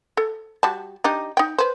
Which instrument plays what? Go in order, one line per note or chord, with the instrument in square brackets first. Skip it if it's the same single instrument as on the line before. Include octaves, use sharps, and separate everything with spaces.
[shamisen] A4
G3 F#4 A5
D4 D#4 G4
D#4 G5
B4 C5